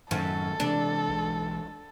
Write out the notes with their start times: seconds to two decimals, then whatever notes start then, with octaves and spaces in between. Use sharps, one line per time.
0.11 F#2 A2 D#3 A4
0.60 C3 E3 G#3 D4
1.08 B1 E3 G#3